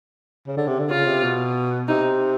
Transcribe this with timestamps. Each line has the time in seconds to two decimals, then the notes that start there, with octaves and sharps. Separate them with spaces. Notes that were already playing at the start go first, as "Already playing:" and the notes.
0.47 C#3
0.57 D3
0.68 C3
0.79 D3
0.90 C#3 F4
1.07 C3
1.23 B2
1.88 C3 D#4